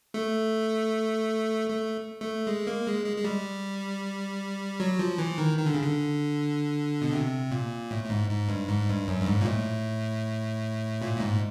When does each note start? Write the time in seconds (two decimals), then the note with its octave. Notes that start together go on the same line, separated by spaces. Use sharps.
0.14 A3
1.69 A3
2.21 A3
2.47 G#3
2.67 A#3
2.86 G#3
3.06 G#3
3.16 G#3
3.24 G3
4.80 F#3
4.99 F3
5.18 E3
5.38 D#3
5.57 D#3
5.66 D3
5.74 C#3
5.83 D3
7.02 B2
7.13 C3
7.51 A#2
7.91 A2
8.04 A2
8.10 G#2
8.30 G#2
8.49 G2
8.68 G#2
8.88 G2
9.07 F#2
9.22 G2
9.26 G#2
9.41 A#2
9.45 A2
11.02 A#2
11.16 A2
11.20 G#2